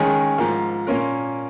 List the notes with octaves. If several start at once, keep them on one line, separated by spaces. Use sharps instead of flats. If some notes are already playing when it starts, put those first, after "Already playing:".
Already playing: D#3 G#3 C#4 G#4
G#2 F3 A#3
A#2 A#3 C#4 A#4